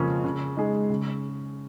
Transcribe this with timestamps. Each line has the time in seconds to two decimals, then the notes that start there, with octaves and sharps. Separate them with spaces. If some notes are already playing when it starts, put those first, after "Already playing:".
Already playing: F2 C#3 F3 A#3 C#4
0.24 C#3
0.57 G#3 D#4 G#4
0.90 C#3